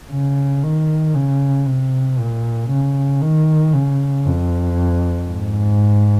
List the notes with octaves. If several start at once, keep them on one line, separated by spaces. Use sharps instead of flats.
C#3
D#3
C#3
C3
A#2
C#3
D#3
C#3
F2
G#2